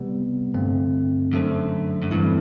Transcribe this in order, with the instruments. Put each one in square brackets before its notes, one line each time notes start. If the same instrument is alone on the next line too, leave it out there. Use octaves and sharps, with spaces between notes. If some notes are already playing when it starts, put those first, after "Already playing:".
Already playing: [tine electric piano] C3 G3 B3
G2 D3 A3 C4
[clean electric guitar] F#2 [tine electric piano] D3 A3 D4 A4 C5
[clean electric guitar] F#2
[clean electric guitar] G2 [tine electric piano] E3 A3 C4 E4